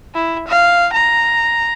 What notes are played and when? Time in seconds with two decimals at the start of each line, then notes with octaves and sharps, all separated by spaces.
0.15 E4
0.48 F5
0.93 A#5